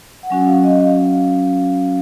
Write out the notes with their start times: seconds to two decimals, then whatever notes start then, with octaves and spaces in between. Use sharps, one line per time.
0.23 F#5
0.30 F#3 C#4 F#4 G#5
0.47 F5
0.64 D#5
0.80 F5